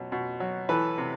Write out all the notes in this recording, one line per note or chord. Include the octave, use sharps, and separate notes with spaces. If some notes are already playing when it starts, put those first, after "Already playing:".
Already playing: B2 F#3
B2
F#3
E3 A4 B4
C3